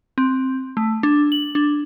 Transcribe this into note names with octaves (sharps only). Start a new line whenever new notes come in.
C4
A3
D4
F#7
D4